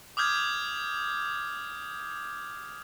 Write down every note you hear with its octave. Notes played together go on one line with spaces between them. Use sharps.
D6 D#6 F6 G6 G#6